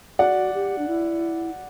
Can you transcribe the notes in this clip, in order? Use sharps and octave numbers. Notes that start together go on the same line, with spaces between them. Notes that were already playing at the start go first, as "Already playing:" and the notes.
F#4 D5 F#5
G4
D4
E4